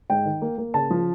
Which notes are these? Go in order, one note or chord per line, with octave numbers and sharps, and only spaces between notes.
G#2 G5
D#3
A#3
A#3
C#3 A5
F3